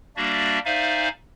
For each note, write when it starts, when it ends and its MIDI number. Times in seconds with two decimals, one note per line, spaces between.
0.17 0.59 55
0.17 0.59 58
0.17 0.59 62
0.17 0.59 66
0.17 0.59 74
0.17 0.59 76
0.65 1.09 63
0.65 1.09 72
0.65 1.09 74
0.65 1.09 76
0.65 1.09 77
0.65 1.09 80